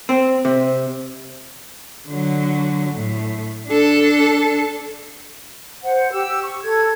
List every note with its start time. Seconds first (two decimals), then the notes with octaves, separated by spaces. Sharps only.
0.09 C4
0.45 C3
2.08 D3 F#3
2.94 A2
3.68 D4 A4
5.83 C5 F#5
6.13 G4 E6
6.43 C#6
6.63 A4 G#6